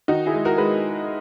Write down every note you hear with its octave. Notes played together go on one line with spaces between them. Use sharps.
D#3 D#4 F#4
E4 G#4
G#3
F#4 A#4
G#3 B4